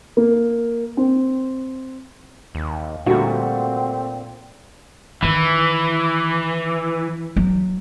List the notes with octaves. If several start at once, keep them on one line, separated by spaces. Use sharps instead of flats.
A#3
C4
D#2
A#2 D3 G3 A3 C4 F#4
D#3 E3
F#3